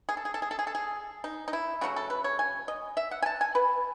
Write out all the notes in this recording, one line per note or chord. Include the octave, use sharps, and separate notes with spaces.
G#4
A4
G#4
A4
G#4
A4
G#4
A4
G#4
D#4
D#4
E4
C#3 F#3 A3 F#4
A4
B4
C#5
G#5
D#5
E5
F#5
G#5
A5
G#5
B4